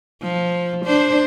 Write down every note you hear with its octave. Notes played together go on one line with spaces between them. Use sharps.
F3
D4 C5